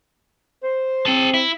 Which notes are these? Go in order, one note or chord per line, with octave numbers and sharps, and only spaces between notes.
C5
C4 G#4 A5
E4